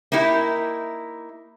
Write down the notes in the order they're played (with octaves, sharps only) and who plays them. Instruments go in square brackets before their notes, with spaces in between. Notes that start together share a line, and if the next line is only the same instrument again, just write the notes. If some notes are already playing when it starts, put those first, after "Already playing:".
[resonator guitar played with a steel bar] A#3 D#4 E4 G4